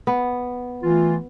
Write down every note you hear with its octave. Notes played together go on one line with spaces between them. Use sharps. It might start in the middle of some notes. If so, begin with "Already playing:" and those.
B3
E3 A3 F4